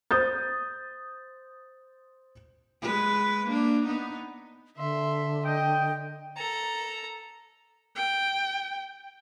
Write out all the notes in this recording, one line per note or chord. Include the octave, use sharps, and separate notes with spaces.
C5 D#6 G6 A6
G#3 B4
A#3 D4
B3 D#4
D3 E5 C6
D#5 G5
A4 A#5
G5